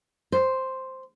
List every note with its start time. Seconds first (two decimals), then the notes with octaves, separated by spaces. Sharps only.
0.32 C5